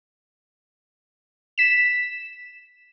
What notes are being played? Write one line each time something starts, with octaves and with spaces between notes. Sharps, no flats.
B6 E7